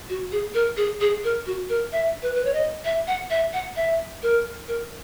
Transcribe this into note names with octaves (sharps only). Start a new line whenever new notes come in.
F#4
G#4
A#4
G#4
G#4
A#4
F#4
A#4
E5
B4
B4
C#5
D#5
E5
F#5
E5
F#5
E5
A#4
A#4